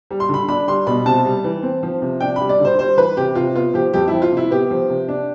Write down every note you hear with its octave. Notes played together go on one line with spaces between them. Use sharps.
G3
C6
D3 B5
D4 B5
G3 C6
B2 B5
C3 A5
G3
E3
C4
F3
C3
D4 G5
G3 B5
D5
D3
C5
G3 C5
E3 B4
C3 G4
C3 F4
B3 F4
F3 G4
F2 G4
F3 E4
F4
C3
E4
B3 G4
F3
C3
D4